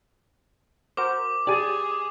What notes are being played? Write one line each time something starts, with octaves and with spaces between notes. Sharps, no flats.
F#4 A#4 C5 D6
G4 G#4 D5 G#5 D#7